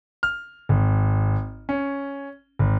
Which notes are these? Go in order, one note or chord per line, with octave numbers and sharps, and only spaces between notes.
F6
G#1
C#4
G#1